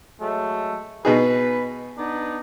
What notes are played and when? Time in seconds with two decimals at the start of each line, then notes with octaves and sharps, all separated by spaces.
0.20 F#3 G#3 A3
1.05 B2 D#4 G#4 B4
1.97 B3 D4 D#4